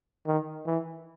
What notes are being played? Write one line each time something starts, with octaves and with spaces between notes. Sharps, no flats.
D#3
E3